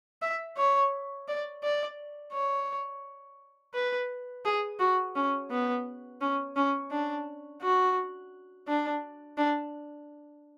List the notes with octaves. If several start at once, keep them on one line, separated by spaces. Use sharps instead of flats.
E5
C#5
D5
D5
C#5
B4
G#4
F#4
C#4
B3
C#4
C#4
D4
F#4
D4
D4